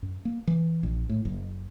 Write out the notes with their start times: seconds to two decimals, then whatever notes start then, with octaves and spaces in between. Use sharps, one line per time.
0.02 F#2
0.25 A#3
0.47 E3
0.83 A#1
1.09 A2
1.25 F#1